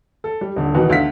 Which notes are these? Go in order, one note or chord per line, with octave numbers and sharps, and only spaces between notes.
A4
G3
D#1 D3
B2 D#3 E3 B3
D2 F5 B6